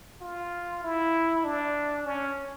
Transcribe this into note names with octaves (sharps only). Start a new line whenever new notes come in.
F4
E4
D4
C#4